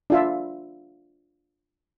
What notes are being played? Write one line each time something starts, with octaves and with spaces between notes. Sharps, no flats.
D4 F4 E5